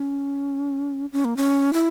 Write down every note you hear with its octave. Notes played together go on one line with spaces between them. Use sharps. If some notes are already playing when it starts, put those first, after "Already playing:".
Already playing: C#4
C#4
A#3
C#4
E4